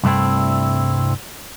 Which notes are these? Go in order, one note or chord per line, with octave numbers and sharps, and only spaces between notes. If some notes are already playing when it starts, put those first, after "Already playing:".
C2 G2 A3 C4 E4